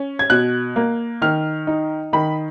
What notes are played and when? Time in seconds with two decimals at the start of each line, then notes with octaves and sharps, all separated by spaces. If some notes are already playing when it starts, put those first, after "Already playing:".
Already playing: C#4
0.19 G#6
0.30 B2 F#6
0.76 A#3
1.22 D#3 F6
1.67 D#4
2.13 D#3 B5